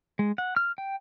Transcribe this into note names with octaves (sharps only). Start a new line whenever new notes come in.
G#3
F#5
F6
G5